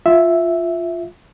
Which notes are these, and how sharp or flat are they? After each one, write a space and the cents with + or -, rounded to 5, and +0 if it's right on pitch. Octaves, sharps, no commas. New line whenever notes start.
F4 +0 E5 +0